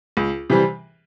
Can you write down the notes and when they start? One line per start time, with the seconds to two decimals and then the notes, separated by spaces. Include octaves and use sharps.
0.17 C#2
0.50 C3 E3 G3